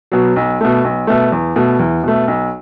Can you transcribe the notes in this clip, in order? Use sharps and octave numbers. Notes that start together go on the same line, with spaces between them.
B2 F#3
B1
B2 A3
B1
B2 A3
E2
B2 A3
E2
B2 A3
B1